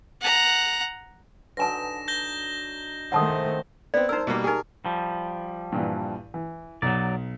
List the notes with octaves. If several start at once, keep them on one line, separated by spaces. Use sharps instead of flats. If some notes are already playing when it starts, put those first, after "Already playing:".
F#5 A#5
D3 F#3 D#4 B4 G#5 A5 A#6 E7
G6 A#6 G7
C3 D#3 G#3 A3 C4 F#5 A5 D#6
B3 C4 D5
D#4 A#4 C5 E6
B2 G3 A#3
D#4 G4 G#4 A#4
F3 G3
G2 A#2 E3
E3
B1 F#3 D5 A#5